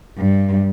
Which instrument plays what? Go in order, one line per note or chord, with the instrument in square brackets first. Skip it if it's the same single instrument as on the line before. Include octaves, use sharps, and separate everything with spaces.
[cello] G2